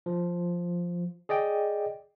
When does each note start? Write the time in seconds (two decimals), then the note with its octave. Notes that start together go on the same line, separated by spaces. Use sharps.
0.06 F3
1.29 G#4 D5 D#5 G5